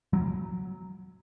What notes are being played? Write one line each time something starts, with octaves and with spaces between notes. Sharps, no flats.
F#3